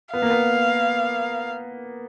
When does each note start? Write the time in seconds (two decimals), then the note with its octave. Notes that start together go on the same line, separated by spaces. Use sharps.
0.13 B3 F5
0.22 A#3
0.30 B3